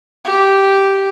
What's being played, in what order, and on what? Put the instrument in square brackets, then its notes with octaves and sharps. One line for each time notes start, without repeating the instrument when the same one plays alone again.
[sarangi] G4